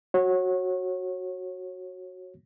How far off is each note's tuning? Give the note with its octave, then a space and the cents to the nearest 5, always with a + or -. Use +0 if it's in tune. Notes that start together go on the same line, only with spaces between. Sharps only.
F#4 +0 C#5 -25